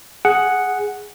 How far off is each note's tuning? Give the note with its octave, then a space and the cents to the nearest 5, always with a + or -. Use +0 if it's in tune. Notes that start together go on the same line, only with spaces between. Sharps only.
G#4 +0 F#5 +0